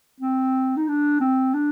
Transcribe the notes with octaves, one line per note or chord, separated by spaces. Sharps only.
C4
D#4
D4
C4
D4